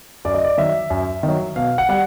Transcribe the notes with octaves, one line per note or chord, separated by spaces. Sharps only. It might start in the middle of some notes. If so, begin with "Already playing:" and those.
F#2 D5
D#5
D5
D#3 F#3 E5
F#2
D#3
F#3
B2 F5
F#5
G3 F#5